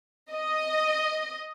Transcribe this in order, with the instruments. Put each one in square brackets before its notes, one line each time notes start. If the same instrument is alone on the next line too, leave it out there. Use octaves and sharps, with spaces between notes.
[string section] D#5